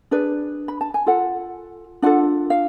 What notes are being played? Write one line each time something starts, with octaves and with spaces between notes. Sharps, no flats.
D4 G#4 B4 D5
B5
A5
G#5
F4 A4 F#5
D4 F4 A4 F#5
F5